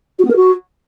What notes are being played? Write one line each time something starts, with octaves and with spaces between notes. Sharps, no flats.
F#4
B3
A#4
F#4